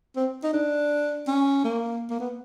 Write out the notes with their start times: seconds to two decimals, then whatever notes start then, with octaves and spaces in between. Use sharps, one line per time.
0.16 C4
0.43 D#4
0.53 D4
1.27 C#4
1.65 A#3
2.10 A#3
2.20 B3